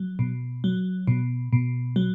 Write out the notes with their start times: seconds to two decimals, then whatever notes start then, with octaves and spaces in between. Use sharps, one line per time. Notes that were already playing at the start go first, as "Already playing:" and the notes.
Already playing: F#3
0.19 B2
0.64 F#3
1.07 B2
1.53 B2
1.96 F#3